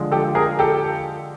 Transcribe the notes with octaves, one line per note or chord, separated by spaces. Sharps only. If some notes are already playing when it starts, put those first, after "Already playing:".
Already playing: D3 F3 G#3
G4 A4
G#4 A#4
G4 A4